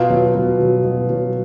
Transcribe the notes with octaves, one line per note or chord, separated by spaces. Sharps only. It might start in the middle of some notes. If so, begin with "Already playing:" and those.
Already playing: B2 F4
F#3
B2
F#3
B2
F#3